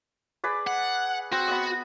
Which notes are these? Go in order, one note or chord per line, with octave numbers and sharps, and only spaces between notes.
G#4 B4 D5
F#5
C4 F#4
B3 D#5 D#6